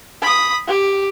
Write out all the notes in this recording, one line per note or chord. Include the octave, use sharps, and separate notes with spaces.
B5 D#6
G4